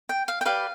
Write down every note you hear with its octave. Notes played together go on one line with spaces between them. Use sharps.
G5
F5
G5
G4 B4 D5 F5